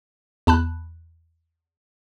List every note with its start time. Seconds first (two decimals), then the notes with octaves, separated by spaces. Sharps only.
0.47 E2 A5 B5 F#6